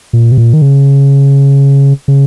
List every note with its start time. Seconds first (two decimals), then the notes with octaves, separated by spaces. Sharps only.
0.13 A#2
0.32 C3
0.38 A#2
0.53 D#3
0.62 C#3
2.08 C#3